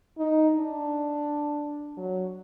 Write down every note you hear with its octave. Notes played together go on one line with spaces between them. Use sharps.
D#4
D4
F#3